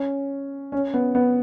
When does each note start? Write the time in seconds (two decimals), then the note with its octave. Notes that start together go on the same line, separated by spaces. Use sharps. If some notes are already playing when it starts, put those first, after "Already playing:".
Already playing: C#4
0.72 C#4
0.94 B3
1.15 B3